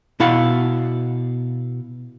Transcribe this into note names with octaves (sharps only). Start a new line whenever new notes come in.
B2 E4 F5 F#5